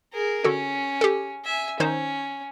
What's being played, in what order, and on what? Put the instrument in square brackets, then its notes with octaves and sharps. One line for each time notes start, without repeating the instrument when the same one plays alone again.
[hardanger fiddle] G#4 A#4
[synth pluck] D3 F#4 A4 [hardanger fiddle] C#4
[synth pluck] G4 A4
[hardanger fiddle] E5 G#5
[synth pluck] D#3 D#4 C5 [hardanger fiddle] C#4